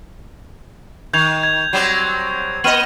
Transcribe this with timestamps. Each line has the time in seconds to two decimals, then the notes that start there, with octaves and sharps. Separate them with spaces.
1.13 D#3 G6 G#6 F7
1.43 G#6
1.73 F#3 G3 C4
2.64 A#3 D#5 F6 D#7 F#7